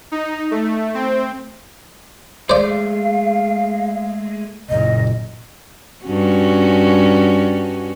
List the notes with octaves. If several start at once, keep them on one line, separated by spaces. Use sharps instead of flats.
D#4
A3
C4
G#3 A3 C5 D5 F5
F#1 A#2 D#5
G2 C#4 F#4